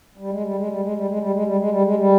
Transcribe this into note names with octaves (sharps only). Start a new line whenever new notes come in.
G3
G#3
G3
G#3
G3
G#3
G3
G#3
G3
G#3
G3
G#3
G3
G#3
G3